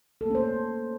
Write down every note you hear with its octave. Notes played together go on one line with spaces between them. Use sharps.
A#3 C#4 A4 C5